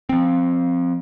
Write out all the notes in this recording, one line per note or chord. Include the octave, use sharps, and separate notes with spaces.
F3 C4